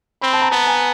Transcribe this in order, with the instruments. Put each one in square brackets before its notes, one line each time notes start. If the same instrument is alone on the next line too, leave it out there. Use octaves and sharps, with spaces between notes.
[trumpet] C4 [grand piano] B5
[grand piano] A5
A#5
[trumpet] B3 [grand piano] A5
[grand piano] G#5